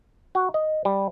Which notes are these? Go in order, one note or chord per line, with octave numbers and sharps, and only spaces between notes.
F#4
D#5
G3